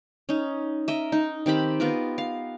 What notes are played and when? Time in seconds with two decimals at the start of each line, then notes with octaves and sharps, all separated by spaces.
0.29 C#4 D#4
0.88 A#4 D#5 E5
1.12 D#4
1.46 D#3 C4 G4 B5
1.80 B3 F4 A#4 B4
2.18 F5